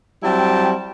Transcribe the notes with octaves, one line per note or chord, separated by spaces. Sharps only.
F#3 G3 C4 E4 G5 A5